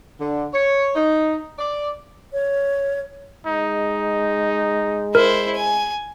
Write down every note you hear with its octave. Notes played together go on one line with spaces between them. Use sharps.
D3
C#5
D#4
D5
C#5
G#3 D#4
E4 A#4 C5
G#5